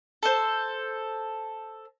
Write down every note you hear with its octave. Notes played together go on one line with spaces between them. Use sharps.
A4 C5